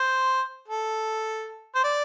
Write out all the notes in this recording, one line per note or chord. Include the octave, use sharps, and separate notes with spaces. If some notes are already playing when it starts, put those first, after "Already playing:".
Already playing: C5
A4
C5
D5